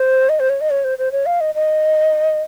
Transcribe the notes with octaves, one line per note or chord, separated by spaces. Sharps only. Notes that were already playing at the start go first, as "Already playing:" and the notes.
Already playing: C5
D#5
C5
C#5
D#5
C#5
C5
C5
C#5
F5
D#5
D#5